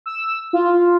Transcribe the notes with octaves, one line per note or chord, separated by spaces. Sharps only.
E6
F4